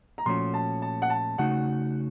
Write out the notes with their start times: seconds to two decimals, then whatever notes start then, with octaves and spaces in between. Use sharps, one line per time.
0.18 A#5
0.26 A#2 F3 A3 C#4 F#4 C6
0.54 A5
0.82 A5
1.02 F#5
1.10 A5
1.38 C#3 A3 D#4 F#4 F#5